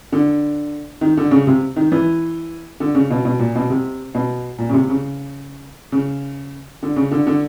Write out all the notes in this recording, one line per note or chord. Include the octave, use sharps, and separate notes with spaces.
D3
D#3
D3
C#3
C3
D#3
E3
D3
C#3
B2
B2
A#2
B2
C3
B2
A#2
C#3
C3
C#3
C#3
D3
C#3
D3
D3